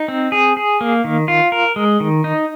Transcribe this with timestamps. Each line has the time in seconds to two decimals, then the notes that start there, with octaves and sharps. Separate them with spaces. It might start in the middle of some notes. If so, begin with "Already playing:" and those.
Already playing: D#4
0.08 C4
0.32 G#4
0.57 G#4
0.81 A#3
1.04 D#3
1.28 F4
1.52 A#4
1.76 G#3
2.00 D#3
2.24 D#4